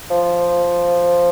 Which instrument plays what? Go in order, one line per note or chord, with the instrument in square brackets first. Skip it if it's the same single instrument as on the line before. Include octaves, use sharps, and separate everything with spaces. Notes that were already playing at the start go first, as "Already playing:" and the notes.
[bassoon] F3